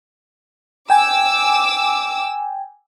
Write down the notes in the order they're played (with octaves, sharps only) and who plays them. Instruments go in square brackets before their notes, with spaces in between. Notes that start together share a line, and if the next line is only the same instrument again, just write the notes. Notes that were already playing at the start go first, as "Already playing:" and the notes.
[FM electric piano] G5 G#5 [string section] D6 E6